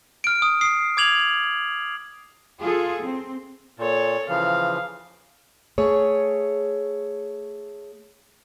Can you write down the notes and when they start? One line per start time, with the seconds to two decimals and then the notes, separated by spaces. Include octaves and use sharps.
0.24 F6 D7
0.42 D#6
0.61 D#6 C7
0.97 D6 G#6 F7 F#7
2.60 F4 G#4 A4
3.01 C4
3.78 A#2 A4 C#5
4.29 C#3 E3 F3 F5
5.78 A3 G#4 C#5